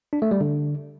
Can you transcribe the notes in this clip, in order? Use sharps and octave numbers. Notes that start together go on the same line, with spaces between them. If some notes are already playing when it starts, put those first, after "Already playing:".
D4
A3
G3
D3